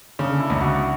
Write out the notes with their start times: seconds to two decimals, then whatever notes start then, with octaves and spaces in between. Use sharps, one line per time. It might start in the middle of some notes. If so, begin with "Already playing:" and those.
0.19 C#3 D4
0.40 E4
0.50 C#2
0.61 F#4